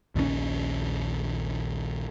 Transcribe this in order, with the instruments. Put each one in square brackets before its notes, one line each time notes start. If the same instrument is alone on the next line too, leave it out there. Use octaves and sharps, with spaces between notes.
[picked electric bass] A#1 D#2 D3 C#4